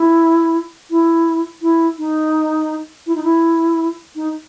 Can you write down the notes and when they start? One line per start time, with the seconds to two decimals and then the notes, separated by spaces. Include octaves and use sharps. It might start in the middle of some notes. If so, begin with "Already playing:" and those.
Already playing: E4
0.90 E4
1.62 E4
1.99 D#4
3.07 E4
3.15 D#4
3.23 E4
4.16 D#4